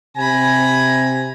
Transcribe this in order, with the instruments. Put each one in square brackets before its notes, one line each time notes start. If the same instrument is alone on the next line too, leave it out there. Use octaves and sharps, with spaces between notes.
[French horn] C3 [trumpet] G#5 [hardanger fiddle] A#5 B5